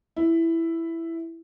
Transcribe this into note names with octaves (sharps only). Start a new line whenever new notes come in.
E4